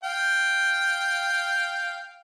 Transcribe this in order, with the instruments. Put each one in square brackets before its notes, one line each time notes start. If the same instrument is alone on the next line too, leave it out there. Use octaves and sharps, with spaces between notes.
[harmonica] F5 G5